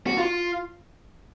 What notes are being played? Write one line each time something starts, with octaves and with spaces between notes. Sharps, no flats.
F#4
F4